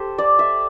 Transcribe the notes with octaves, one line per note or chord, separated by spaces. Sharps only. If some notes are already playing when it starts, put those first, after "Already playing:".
Already playing: G4 A4 C5
D5
E5